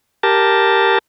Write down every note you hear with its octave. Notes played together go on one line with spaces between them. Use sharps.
G4 A#4 A5